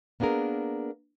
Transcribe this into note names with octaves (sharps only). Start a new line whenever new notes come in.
A#3 B3 D4 G#4 A#4